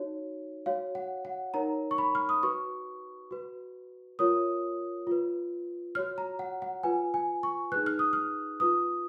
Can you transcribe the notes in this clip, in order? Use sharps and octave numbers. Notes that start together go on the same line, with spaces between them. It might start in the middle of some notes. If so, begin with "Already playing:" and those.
Already playing: D#4 F#4 C#5
F#4 C#5 F5
F#5
F#5
D#4 A#4 C#5 A#5
C#6
B5
F6
D#6
F#4 B4 C#6
F#4 B4
F4 A#4 C#5 D#6
F4 B4
F#4 C#5 F6
A#5
F#5
F#5
F4 B4 G#5
G#5
C#6
D#4 G#4 B4 F#6
F6
D#6
F6
F4 B4 D#6